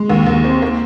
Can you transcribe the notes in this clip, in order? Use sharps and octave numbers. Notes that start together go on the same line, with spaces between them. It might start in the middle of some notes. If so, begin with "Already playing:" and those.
Already playing: G#3
D#2
D#2
C4
A#3